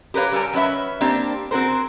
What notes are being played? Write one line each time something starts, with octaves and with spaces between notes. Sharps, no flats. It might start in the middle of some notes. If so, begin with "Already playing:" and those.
G4 A#4 B4 C#5 F5
G3 A4 A#4 G#5 A#5
F#3 C#4 B4 D5 E5
A#3 C4 D4 G4
C4 F#4 G#4 A#4 C5